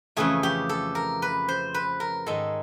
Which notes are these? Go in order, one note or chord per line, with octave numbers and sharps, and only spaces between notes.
F2 C#3 E3 A3 G#4
G4
A4
A#4
B4
C5
B4
A#4
G#2 D#3 G#3 A4